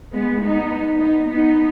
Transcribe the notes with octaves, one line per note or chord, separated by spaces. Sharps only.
G#3 B3
B3 D#4
B3 D#4
B3 D#4